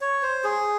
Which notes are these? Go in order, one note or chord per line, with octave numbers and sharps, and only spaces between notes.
C#5
C5
G#4